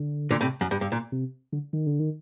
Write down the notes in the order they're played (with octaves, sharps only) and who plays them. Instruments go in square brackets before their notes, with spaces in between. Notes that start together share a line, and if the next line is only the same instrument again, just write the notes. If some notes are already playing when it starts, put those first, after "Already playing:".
Already playing: [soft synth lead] D3
[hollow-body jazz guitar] A#2 D3
A2 C3
F#2
G2
G2
A#2
[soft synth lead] C3
D3
D#3
D3
D#3